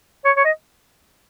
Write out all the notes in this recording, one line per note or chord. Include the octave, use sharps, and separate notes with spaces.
C#5
C#5
D#5